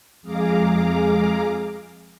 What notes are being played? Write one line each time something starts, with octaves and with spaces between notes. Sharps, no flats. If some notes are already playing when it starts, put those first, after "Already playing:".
F2 G#3 G#4 F5 A#5 D6